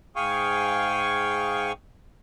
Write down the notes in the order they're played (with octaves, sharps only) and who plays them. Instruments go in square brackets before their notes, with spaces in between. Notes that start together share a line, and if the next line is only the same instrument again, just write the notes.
[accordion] G#2 G#4 F5 G5 G#5 C#6